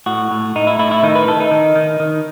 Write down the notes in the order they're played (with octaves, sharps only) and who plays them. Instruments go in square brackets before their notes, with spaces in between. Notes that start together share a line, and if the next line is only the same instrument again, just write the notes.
[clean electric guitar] A2 F#4
A2
A2 D#4
E4
A2 E4
E4
D#3 D#4
B4
D#3 A4
D#4
D#3
D#3
D#3